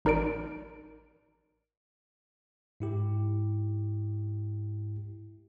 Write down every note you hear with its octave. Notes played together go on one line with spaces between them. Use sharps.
A1 D#4 A#4 D5 D7
G#2 E4 G4